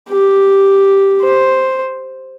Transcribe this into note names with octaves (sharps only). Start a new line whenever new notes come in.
G4
C5